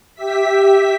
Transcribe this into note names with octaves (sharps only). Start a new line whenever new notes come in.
G4 E5 B6